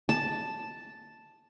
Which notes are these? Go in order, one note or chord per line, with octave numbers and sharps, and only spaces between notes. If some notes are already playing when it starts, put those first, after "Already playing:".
A5